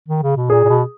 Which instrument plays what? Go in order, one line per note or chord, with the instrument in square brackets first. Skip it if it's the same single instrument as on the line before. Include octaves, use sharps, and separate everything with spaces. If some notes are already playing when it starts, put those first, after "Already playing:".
[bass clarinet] D#3
C#3
B2
[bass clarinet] A#2 [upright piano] G#4
[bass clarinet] A#2
B2